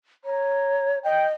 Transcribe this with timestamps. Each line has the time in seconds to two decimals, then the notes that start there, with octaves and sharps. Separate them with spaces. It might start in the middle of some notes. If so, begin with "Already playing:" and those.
0.25 C#5 A#5
1.05 D#5 G5